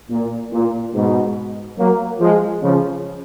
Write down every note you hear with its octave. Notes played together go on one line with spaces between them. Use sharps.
A#2
A#2
G#2 B2
F#3 A#3
F3 G#3
C#3 F3